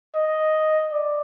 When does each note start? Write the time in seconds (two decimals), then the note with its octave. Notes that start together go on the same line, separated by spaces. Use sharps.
0.15 D#5
0.93 D5